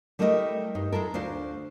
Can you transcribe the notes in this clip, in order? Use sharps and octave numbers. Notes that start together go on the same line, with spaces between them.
G3 A3 E4 A#4 C#5 D#5
G2 D#4
G#3 E4 A4 A#4
D2 D4 F4 C5